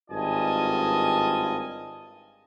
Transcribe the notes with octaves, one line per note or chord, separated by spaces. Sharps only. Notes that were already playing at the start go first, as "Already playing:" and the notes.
G#1 G2 F4 D#5 G#5 A5